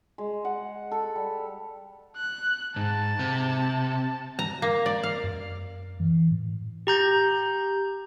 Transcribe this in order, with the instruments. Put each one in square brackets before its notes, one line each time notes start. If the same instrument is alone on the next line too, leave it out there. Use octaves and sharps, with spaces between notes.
[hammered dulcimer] G#3
F#5
A4
G3
[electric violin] F#6
[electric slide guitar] G#2 [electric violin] A5
[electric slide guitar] C3
[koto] A#5
A#3
D5
F5
[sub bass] F#2
E3
A2
[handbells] G4 A#5 G6